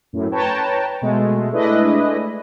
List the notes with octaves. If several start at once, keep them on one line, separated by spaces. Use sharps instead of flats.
F#2 A2
B4 C#5 G5 A5 A#5
B2 G#3 A3
G#3 A3 D4 E4 B4 D#5